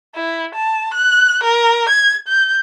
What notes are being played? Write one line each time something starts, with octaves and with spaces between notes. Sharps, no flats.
E4
A5
F#6
A#4
G#6
G6